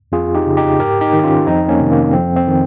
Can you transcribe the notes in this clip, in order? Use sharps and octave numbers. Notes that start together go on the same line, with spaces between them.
F2 F4 G#4
D#4 G4
C#3
D#4 G4
G#2 G4 A#4
D#4 G4
D#3
G4
C#4 F4
F2 C4 D#4
A#3 C#4
C3 D#3
A#3
F2 C4
C4
D#3